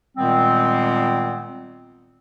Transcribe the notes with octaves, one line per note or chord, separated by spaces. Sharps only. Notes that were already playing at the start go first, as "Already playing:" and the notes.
A#2 D#3 G3 G#3 B3 C4